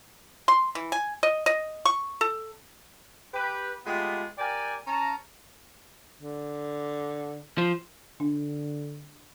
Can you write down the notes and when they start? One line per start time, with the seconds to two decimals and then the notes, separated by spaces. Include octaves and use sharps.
0.48 C6
0.75 E3
0.92 G#5
1.23 D#5
1.46 D#5
1.85 C#6
2.21 A4
3.33 G4 B4
3.86 G#3 A3 B3 F4 G4
4.38 G4 A#4 D5 G5 G#5
4.86 C#4 A5 A#5
6.19 D3
7.58 F3 C5
8.20 D3 D4